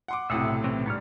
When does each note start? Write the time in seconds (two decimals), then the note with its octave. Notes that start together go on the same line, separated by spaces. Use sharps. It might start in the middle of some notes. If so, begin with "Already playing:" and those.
0.08 F#5 C6 D6
0.30 B1 A2 C3 E5 F#5 D#6
0.64 E3 C4 C#4
0.86 G#2 G3 B3 C#5 F6